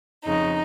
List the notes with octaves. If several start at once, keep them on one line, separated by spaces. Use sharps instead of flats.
F2 C#3 D#4